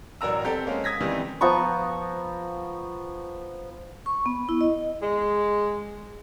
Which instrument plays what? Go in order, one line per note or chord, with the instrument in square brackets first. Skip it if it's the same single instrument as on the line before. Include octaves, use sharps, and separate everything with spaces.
[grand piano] A1 F#3 A#4 D5 A#5 E6
B3 C4 G4 A4
G#3 A#3 C#4
D#6 G#6 A#6 B6
C3 D#3 E3 G3
[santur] F3 B3 A#5 C#6
[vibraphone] C#6
B3
E4
D#5
[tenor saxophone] G#3